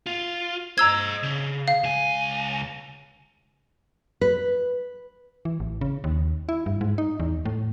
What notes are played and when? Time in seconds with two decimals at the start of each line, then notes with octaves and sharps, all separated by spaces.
0.06 F4
0.78 C5 D#5 A#5 E6 G#6
1.23 C#3
1.68 F5
1.84 C#2 G#5
4.21 B4
5.45 E3
5.60 A1
5.81 C#3
6.04 D#2
6.49 E4
6.66 G2
6.81 G#2
6.98 D#4
7.20 E2
7.45 A2